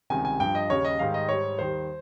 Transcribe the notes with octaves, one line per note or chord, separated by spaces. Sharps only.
C#2 C3 D#3 G3 G#5
G#5
G2 F3 G5
D#5
D#2 C#3 G3 C#5
D#5
G#2 D#3 G3 F5
D#5
G#2 G3 C#5
D#2 D#3 G3 C5